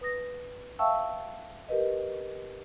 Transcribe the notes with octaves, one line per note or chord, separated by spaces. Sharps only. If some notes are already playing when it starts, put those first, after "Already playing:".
B4 D#6 A#6
E5 F5 G5 A5 C#6 E6
G4 A#4 B4 D#5